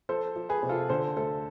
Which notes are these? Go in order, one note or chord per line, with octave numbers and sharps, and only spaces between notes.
F3 A4 C5
F3
G#4 B4
C3
F4 A4
D3 A4 C5
D2 A4 C5